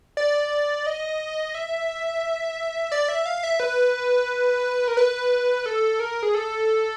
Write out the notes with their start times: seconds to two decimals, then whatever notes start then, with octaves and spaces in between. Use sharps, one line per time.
0.17 D5
0.86 D#5
1.55 E5
2.92 D5
3.08 E5
3.26 F5
3.43 E5
3.60 B4
4.88 A#4
4.97 B4
5.66 A4
6.00 A#4
6.23 G#4
6.35 A4